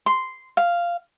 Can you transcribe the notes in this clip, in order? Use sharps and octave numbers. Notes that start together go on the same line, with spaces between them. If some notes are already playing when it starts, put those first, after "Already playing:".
C6
F5